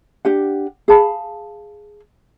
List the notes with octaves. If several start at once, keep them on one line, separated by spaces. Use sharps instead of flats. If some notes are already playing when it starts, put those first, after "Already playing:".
D4 G4 F#5
G#4 F5 A5 B5